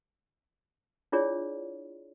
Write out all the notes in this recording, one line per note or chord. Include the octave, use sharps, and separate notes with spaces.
D4 E4 F4 G#4 C#5 D5